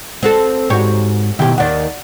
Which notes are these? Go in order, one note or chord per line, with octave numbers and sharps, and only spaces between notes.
C4 F#4 A4
G#2 F#4 G4 C#5
B2 D#3 E4 G4 G5
D#2 D#3 D5 F#5